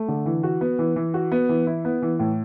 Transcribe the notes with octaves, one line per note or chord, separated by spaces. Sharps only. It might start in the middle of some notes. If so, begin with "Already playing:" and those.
Already playing: A3
D3
E3
F#4
B3
E3
E3
F#4
B3
E3
E4
B3
E3
A2